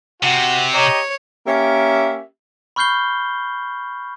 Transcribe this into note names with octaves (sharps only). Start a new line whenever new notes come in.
C3 F#4 F#5
G4 C#5 D#5 A#5
A#3 C#4 G4 E5
B5 C#6 F6 G6 C7 G7